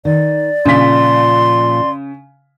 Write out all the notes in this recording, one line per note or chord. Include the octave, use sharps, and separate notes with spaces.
D#3 D5
A#2 C#3 F3 C6 B6